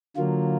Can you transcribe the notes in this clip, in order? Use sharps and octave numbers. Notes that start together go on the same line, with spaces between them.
D3 F#3 A#3 F4